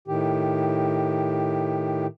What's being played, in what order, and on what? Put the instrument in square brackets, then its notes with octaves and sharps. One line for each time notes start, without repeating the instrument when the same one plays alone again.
[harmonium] A2 D#3 G4